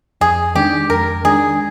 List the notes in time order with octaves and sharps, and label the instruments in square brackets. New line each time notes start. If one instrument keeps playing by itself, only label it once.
[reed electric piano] F2 [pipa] G#4
[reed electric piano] D#3 G#3 D4 [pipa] G4
[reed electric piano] F2 [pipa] A#4
[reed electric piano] D#3 G#3 D4 [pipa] G#4